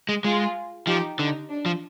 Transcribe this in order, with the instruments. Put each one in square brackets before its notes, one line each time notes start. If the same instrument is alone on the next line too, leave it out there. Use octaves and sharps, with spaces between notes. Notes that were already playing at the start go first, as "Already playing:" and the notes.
[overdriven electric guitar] G#3
[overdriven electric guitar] G#3 [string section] F4 G#4
[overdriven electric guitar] F3 [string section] D#4 G4
[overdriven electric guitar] D3 [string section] D#4
[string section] D4
[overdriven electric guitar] F3